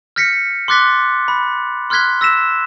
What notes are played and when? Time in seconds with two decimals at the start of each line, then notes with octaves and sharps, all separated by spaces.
0.16 F6 G6 A#6 B6 C#7
0.68 C6 D6 F#6 A6 B6 G7
1.28 B5
1.90 C6 F6 F#6 G#6 B6 G7
2.21 E6 A#6 B6 E7